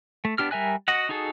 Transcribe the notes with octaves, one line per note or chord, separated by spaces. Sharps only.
A3
B3 D4 G4 F6
G3 A#4 E5 G#5 F#6
F#4 D#5 F#5
D#4 F#4 G#4 A4